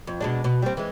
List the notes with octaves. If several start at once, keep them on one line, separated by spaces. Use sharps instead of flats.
F2
B2 G#3 D4
B2
G3 C4
E3 G#3